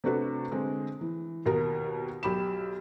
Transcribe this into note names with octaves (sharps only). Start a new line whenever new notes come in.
C3 A3 D4 F#4 A4 B4
D3 G#3 C4
E3
D#2 B2 A#4 A#5
B1 G4 B5 E7